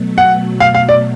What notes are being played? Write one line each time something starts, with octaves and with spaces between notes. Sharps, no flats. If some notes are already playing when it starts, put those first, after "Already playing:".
Already playing: B2 F#3 A3
F#5
F5
F5
D5